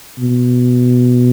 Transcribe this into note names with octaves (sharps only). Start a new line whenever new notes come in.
B2